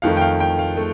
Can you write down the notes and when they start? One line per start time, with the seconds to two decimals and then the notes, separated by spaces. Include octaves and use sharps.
0.02 F2 D#3 A3 F5
0.17 G5
0.21 F5
0.40 G5
0.59 F5
0.77 A3